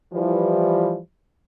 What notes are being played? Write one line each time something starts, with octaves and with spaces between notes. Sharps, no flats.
E3 F3 G3